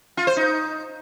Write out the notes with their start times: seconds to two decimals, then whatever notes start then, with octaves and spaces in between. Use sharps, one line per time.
0.17 F4
0.27 C5
0.37 D#4